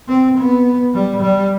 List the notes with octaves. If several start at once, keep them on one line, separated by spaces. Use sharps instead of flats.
C4
B3
G3
G3